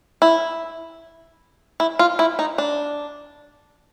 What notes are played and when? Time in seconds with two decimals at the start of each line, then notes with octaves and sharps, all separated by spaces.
0.22 E4
1.80 E4
1.99 F4
2.19 E4
2.39 D#4
2.58 D4